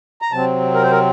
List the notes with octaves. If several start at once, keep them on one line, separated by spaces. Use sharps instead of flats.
A#5
C3 F#3 C4 A5
A#4
C5
A#4